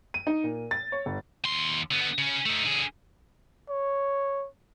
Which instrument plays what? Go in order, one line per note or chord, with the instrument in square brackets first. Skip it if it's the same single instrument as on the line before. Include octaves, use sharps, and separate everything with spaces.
[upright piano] D#7
D#4
A#2
A6
C#5
G1
[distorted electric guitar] D#2 C6
D3 B3
C#3 C#4
A3 D#4
D3 G#4
[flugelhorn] C#5